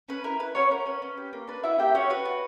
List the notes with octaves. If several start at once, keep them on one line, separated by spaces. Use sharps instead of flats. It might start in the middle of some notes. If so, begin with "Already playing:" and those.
C#4 B4
E4 A#4
E4 B4
C#4 F#4 C#5
C#4 A#4
C#4 B4
C#4
G4
A#3
D4 B4
E4 F#4 E5
A#3 G4 G5
C#4 F#4 C#5
F#4 B4
F#4